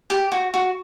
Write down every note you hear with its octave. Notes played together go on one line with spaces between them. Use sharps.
G4
F#4
F#4